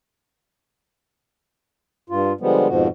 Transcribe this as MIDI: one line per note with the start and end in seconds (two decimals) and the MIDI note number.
2.10 2.32 43
2.10 2.32 65
2.41 2.68 50
2.41 2.68 53
2.41 2.68 55
2.41 2.68 56
2.41 2.68 59
2.68 2.88 41
2.68 2.88 44
2.68 2.88 47
2.68 2.88 53
2.68 2.88 66